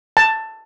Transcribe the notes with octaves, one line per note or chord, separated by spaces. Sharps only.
A5